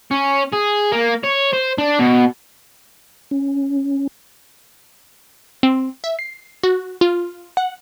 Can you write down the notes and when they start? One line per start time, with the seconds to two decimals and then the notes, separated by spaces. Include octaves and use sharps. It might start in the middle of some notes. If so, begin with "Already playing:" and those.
0.11 C#4
0.52 G#4
0.92 A#3
1.24 C#5
1.53 C5
1.78 D4
1.99 B2
3.31 C#4
5.63 C4
6.04 E5
6.19 C7
6.63 F#4
7.01 F4
7.57 F#5